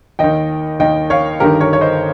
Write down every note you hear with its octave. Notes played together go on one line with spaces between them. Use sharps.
D#2 D#3 D#5 G5
D#2 D#3 D#5 G5
C#5 F5
G1 G2 D#3 G4 A#4
A#4 C#5
C#5
C5 D#5